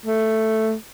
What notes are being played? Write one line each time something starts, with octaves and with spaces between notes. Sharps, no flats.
A3